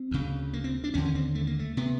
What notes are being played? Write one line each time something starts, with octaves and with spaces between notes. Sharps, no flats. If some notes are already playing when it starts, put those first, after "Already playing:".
Already playing: C4
D2 C#3
A#3
C4
D4
D#2 D3 C#4
C#4
C4
A3
A#3
A3
C3 B3